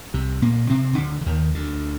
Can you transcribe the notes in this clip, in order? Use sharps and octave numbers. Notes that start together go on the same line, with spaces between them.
C2 C3
A#2 A#3
C3 C4
C3
D2 D3
D3
D#2 D#3
D2 D3